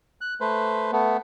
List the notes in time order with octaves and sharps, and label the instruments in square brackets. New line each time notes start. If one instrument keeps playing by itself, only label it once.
[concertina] F#6
A3 B4 C5
A3 B3